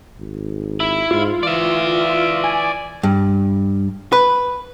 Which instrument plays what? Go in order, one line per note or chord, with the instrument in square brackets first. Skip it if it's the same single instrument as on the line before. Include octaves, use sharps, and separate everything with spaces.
[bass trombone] G#1
[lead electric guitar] E4
[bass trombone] G#2 [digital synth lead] F4
[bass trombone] E3 [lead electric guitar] D5 E5
[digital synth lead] G#5
[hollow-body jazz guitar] G2
B4